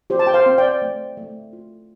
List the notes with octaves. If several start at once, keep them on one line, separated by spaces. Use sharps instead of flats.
F4 G4 C5
A5
G5
C5 F5
C4
D5 G5
A3
A3
F4